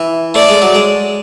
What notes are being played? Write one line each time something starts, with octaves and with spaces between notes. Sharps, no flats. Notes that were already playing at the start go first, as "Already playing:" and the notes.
Already playing: E3
A3 D5
G#3
F#3
G#3